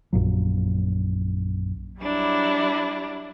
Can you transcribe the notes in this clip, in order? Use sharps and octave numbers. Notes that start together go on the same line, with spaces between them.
A#1 F#2 A#2 F#3
F#3 G3 D4 E4